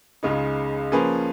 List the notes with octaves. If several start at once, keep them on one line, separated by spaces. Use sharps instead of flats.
C#2 C#3 G#3 D#4
F3 A#3 C#4 G#4 B4